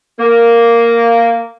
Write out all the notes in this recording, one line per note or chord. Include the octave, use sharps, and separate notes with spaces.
A#3